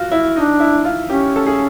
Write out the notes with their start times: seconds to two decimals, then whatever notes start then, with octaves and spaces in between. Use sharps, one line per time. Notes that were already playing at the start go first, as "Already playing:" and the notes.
Already playing: F4 F#4
0.11 E4
0.36 D4 D#4
0.60 E4
0.85 F4
1.09 C#4 G4
1.36 A4
1.46 G#4